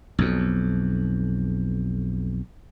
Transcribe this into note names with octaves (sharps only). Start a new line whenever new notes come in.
B1 F2